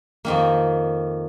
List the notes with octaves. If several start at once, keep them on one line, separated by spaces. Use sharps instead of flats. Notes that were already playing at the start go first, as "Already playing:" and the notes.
F2 D#3 A#3